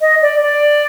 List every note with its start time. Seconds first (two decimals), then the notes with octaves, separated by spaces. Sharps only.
0.01 D#5
0.22 D5
0.42 D5